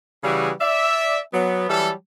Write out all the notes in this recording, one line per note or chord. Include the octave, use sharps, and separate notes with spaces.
C#3 E3 G3 F#4 G#4
D5 E5
F#3 B3
E3 F#3 G3 A4